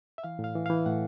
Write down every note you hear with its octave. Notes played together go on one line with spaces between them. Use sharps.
E5
E3 F5
A2
F5
E3
E3 F5
A2 F#5